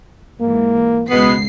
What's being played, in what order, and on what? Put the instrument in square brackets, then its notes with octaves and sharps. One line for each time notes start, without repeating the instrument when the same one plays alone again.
[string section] G#2 E3 [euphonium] A#3
[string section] C#2 C7 [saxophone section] B2 G#3 B3